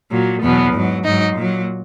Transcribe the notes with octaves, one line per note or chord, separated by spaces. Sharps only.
A#2 F#3
E2 B2 F#3 B3
G#2 F#3
G#2 F#3 D#4
A#2 F#3